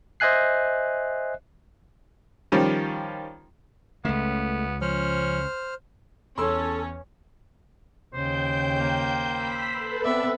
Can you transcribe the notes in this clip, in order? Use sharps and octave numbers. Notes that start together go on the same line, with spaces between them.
C5 D#5 E5 G#5 F#6 C7
D#3 F3 G3 C#4
C#2 C#3 A3 B3
F3 C#4 C5 F6
E2 C#4 A4 C6 E6
D#2 C#3 C5 G5 G6
A#3
B5 E6 B6
A4 B4
B3 C4 D5 E5